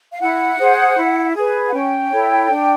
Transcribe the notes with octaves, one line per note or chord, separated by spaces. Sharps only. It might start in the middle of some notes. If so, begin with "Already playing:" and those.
F5
E4 F#5
G#4 C5
E4
G#4 B4
F#5
C#4 G5
E4 A4 C#5
D4